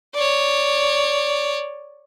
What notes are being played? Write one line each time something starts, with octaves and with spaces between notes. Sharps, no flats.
C#5 D5